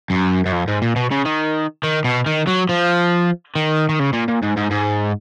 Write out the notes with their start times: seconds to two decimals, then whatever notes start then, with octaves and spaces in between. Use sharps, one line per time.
0.10 F#2
0.46 F#2
0.52 F2
0.68 G#2
0.82 A#2
0.96 B2
1.11 C#3
1.25 D#3
1.83 D#3
2.04 B2
2.26 D#3
2.47 F#3
2.69 F3
3.56 D#3
3.89 D#3
4.00 C#3
4.13 A#2
4.28 A#2
4.43 G#2
4.57 G#2
4.71 G#2